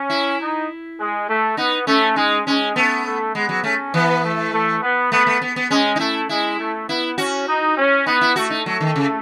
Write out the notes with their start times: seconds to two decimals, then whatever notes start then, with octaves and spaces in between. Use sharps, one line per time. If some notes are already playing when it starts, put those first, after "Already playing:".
Already playing: C#4
0.10 E4
0.40 D#4
0.99 G#3
1.28 A3
1.57 B3 D#4
1.87 A3 C#4
2.16 G#3 D#4
2.46 G#3 C#4
2.76 A3 B3
3.05 A3
3.35 G#3 B3
3.49 F#3
3.64 A3 C#4
3.94 E3 B3
4.23 A3
4.53 A3
4.82 B3
5.12 A3 B3
5.27 A3
5.42 B3
5.56 B3
5.70 G#3 C#4
5.96 D#4
6.00 A3 E4
6.29 G#3 E4
6.59 A3
6.89 B3 E4
7.18 C#4 F#4
7.48 D#4
7.77 C#4
8.06 B3 D#4
8.21 E4
8.36 A3 F#4
8.50 D#4
8.66 F#3 A3
8.80 D#3
8.96 C#3